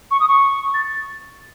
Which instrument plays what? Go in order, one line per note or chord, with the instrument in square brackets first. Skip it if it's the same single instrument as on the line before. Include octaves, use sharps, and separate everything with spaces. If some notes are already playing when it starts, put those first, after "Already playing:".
[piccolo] C#6
D#6
C#6
A6